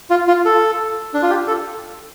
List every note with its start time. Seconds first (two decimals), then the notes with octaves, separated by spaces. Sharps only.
0.10 F4
0.28 F4
0.45 A4
1.14 D4
1.22 F4
1.30 G4
1.47 A4